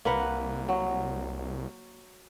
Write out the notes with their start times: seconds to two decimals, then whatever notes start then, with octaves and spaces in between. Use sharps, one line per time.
0.05 C2 A#3 B4 F#5
0.69 F#3